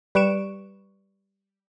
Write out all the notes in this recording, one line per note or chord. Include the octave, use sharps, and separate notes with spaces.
G3 B4 C#6 D7 E7